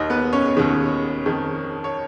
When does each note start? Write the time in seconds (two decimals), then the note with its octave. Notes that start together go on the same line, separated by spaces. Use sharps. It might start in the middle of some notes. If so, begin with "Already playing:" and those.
Already playing: D#2 D#3 D#4 D#5
0.10 B3 B4
0.33 C#4 C#5
0.57 D#2 D#3
1.26 F2 D#3
1.84 C#5